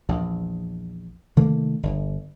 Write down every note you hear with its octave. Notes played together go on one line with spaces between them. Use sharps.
A#1 E2
C3 D#3 A3 A#3
G1